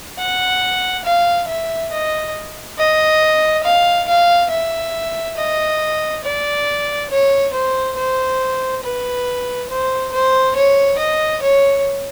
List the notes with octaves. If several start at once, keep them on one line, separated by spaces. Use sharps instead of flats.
F#5
F5
E5
D#5
D#5
F5
F5
E5
D#5
D5
C#5
C5
C5
B4
C5
C5
C#5
D#5
C#5